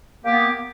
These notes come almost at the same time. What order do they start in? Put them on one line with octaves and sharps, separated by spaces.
A#3 G4 B3